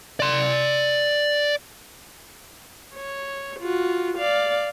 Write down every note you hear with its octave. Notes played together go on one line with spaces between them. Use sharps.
D5 C6
C#5
F4 F#4
D5 F5